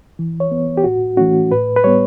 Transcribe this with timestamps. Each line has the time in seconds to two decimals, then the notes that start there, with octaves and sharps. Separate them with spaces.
0.19 E3
0.40 C#5
0.51 B3
0.77 G4
0.84 A2 F#4
1.17 E3 A3 C#4 F#4
1.51 A2 B4
1.76 B4
1.84 G3 B3 C#5